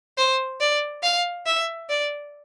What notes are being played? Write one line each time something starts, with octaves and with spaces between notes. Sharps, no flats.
C5
D5
F5
E5
D5